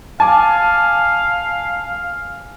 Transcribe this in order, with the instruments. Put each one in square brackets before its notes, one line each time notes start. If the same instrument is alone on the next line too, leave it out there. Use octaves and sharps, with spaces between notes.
[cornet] F5 [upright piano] G#5 D6 [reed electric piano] A5